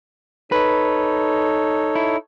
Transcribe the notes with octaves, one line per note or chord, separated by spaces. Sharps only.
D#4 A4 B4 C#5
E4